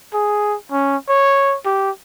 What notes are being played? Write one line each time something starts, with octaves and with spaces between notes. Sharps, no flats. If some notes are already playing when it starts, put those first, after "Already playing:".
G#4
C#4
C#5
G4